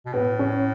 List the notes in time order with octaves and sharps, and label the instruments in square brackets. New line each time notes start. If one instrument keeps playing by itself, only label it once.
[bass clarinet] B2
[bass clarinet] A2 [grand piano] B3
[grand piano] C#4